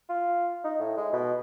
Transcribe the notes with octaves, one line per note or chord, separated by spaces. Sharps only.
F4
D#4
A2
G#3
B2